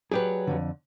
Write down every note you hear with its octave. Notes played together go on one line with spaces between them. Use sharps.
F#3 G4 G#4 B4 D5
F2 G#2 D3